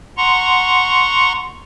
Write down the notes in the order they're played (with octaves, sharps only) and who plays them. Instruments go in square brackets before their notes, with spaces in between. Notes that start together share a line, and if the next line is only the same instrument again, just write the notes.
[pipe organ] F#5 A#5 C6 C#6